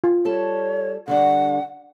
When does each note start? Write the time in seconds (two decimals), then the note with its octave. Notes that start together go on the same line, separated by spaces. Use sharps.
0.04 F4
0.25 G3 A4 C#5 A5
1.08 D3 G3 D4 F#5